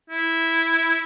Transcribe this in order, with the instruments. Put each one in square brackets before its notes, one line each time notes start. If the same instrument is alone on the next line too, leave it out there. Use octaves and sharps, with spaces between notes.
[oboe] E4